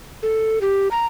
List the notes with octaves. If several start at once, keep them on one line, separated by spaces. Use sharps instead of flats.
A4
G4
A#5